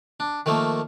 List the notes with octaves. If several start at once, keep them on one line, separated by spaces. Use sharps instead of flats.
D4
D#3 F3 A3 A#3